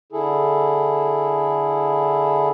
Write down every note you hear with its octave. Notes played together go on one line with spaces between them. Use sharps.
D3 E4 G#4 A4